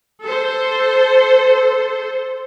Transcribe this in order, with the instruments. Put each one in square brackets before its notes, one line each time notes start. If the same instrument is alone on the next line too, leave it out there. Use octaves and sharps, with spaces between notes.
[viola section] A4 C5